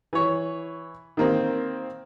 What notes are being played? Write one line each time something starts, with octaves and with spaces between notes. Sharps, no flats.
E3 C#5
D#3 A#3 C4